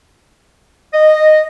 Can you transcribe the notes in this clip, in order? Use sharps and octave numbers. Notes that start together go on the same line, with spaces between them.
D#5